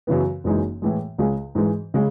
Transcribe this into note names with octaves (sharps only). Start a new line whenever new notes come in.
F#2 C#3 E3 B3
F#1 F#2 E3 G#3 D#4
A2 E3 G#3
C#2 C#3 G#3
G#2 E3 G#3
C#3 G#3